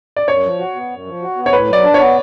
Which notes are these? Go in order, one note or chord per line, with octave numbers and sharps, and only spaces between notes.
D5
F#2 C#5
F3
F#4
B3
F#2
F3
F#4
B3
C#5
A2 B4
F#3
D5
D4
B3 C#5